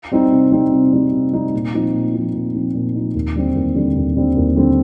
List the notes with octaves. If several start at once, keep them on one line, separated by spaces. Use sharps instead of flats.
G3 C4 D#4
C3
G3 C4 D#4
C3
G3 C4 D#4
C3
G3 C4 D#4
A#2
F3 C4 D#4
A#2
F3 C4 D#4
A#2
F3 C4 D#4
A#2
F3 C4 D#4
D#2
D3 G3 C4
D#2
D3 G3 C4
D#2
D3 G3 C4
D#2
D3 G3 C4